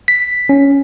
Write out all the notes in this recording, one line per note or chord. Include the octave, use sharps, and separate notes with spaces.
B6
C#4